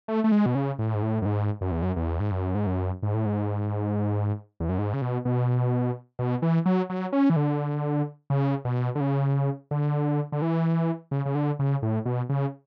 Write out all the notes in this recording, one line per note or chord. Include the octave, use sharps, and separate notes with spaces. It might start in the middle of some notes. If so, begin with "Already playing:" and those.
A3
A3
G#3
B2
C#3
A2
G#2
A2
F#2
G#2
F#2
E2
F#2
E2
G#2
F#2
G#2
F#2
G#2
A2
G#2
E2
F#2
G#2
C#3
B2
B2
B2
E3
F#3
F#3
C#4
E3
D3
C#3
B2
D3
C#3
D3
D3
E3
C#3
C#3
D3
C#3
A2
B2
C#3